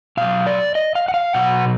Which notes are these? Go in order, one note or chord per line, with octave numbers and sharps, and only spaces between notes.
B2 F#3 F5
D5
D#5
F5
F#5
F5
B2 F#3 F#5